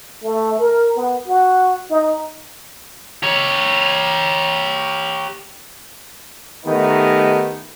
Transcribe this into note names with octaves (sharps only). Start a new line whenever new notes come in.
A3
A#4
B3
F#4
D#4
G4 C#5
D#3 A3 B3 D#4 G4